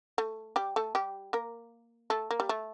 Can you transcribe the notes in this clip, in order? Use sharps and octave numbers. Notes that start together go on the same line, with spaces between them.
A3
G3 G4
A3 A4
G3 G4
A#3 A#4
A3 A4
A#3
G3
A3